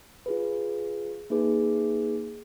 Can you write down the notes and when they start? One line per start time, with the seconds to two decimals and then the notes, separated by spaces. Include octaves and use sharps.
0.26 F4 G#4 B4
1.30 A#3 D#4 G#4 B4